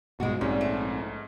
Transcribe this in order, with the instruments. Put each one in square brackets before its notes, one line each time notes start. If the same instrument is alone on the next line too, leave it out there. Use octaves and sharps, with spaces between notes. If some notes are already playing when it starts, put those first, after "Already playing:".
[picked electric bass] C2 G#2 B2 [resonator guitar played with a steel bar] G#3 F#4
[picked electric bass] A#1 C4 [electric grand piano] G#2 C#4 [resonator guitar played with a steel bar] G3
[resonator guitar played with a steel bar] A3